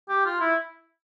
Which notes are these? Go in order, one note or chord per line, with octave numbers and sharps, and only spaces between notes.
G4
F4
E4